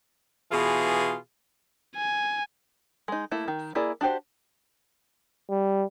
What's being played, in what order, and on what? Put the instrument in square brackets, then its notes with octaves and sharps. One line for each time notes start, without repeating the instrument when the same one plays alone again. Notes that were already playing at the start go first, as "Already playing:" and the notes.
[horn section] B2 E3 F4 G#4
[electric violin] G#5
[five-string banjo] G#3 D#4
A3 A#3 E4
D#3
A#3 E4 G#4 D5
D4 F#4 G4 C5
[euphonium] G3